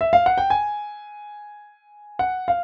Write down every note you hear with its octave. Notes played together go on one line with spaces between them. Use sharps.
E5
F5
F#5
G5
G#5
F#5
F5